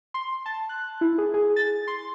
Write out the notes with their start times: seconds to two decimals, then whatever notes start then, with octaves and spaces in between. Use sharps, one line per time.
0.14 C6
0.46 A5
0.69 F#6
1.01 E4
1.18 G#4
1.34 G#4
1.56 A6
1.87 C6